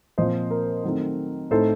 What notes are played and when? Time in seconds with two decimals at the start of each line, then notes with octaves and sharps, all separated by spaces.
0.18 A#2 F3 C4 C5 D#5
0.51 A#4
0.84 D#3 F#3 A3 C4 D#4
1.51 A2 A3 C4 D#4 A4 C5